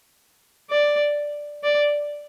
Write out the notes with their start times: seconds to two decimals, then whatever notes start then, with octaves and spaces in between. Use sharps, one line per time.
0.70 D5
1.63 D5